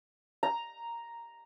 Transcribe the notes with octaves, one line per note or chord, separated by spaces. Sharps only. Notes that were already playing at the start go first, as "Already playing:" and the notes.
A#5